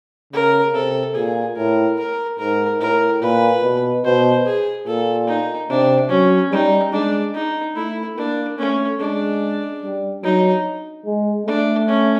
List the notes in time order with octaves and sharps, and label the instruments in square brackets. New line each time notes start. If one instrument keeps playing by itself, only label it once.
[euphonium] C#3 [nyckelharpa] A#4
[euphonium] C3 [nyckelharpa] A4
[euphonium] A#2 [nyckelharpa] G#4
[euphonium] A2 [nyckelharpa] A#4
[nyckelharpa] A#4
[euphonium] G#2 [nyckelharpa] A#4
[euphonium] A2 [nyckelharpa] A#4
[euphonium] A#2 [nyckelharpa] B4
[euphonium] B2
[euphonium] B2 [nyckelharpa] C5
[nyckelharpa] G#4
[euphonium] A#2 [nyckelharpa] A4
[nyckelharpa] D#4
[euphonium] C3 [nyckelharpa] D4
[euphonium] F#3 [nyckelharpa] C#4
[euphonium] G3 [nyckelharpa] D#4
[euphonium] G#3 [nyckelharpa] D4
[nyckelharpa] D#4
[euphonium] A3 [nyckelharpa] E4
[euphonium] A#3 [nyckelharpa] D4
[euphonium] A3 [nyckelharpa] C#4
[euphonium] G#3 [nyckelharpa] D4
[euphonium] G3
[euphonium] F#3 [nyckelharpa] D#4
[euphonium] G#3
[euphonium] A3 [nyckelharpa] D4
[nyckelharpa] C#4